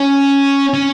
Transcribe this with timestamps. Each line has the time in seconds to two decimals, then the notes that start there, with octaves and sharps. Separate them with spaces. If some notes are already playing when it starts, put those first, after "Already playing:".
Already playing: C#4
0.74 C#4